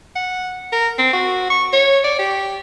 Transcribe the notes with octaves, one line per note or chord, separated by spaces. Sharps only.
F#5
A#4
C4
F#4
C#6
C#5
D5
G4